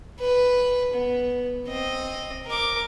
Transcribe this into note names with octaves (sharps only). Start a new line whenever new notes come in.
B4
B3
C4 D#5
A#4 D6